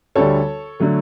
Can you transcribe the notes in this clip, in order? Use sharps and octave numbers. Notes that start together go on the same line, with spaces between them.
D2 D3 G3 A4 C#5
D3 F#3 A3